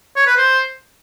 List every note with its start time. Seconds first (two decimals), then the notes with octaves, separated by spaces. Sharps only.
0.16 C#5
0.26 B4
0.37 C5